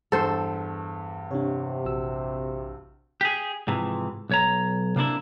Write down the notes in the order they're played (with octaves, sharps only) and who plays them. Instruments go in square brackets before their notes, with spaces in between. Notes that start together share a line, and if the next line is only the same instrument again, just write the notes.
[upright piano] E2 G2 [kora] A4 C5
[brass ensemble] C3 [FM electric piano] D4 C#5
[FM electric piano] A#1 F#4 E6
[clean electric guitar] G4 G#4
G#2 C3 E3 F3
B1 C#5 A#5
C3 A#3 D4 E4